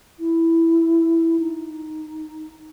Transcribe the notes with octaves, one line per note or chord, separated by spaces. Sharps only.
E4
D#4